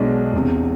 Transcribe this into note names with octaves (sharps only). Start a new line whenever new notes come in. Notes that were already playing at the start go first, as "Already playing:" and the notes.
Already playing: B1 B2 G#3 D4
E1 E2 C3